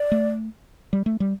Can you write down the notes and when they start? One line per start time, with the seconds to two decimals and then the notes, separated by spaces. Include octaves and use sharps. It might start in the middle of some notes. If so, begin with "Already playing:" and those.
Already playing: D5
0.12 A3
0.93 G3
1.06 A3
1.20 G3